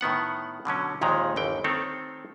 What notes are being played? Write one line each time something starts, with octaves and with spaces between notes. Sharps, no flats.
A2 D#3 B3 F#5
B2 D3 F#3 C#4
A#1 D#2 A#2 D#3 G#3 A#5
G1 D#2 E3 G5
D#3 A3 C4 A4 C#5